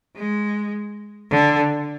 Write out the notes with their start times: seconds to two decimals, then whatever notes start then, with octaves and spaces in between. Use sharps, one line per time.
0.16 G#3
1.31 D3